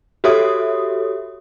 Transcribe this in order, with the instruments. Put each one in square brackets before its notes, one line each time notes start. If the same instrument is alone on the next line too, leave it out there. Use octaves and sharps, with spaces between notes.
[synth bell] F#4 G4 A4 C#5 E5 D#6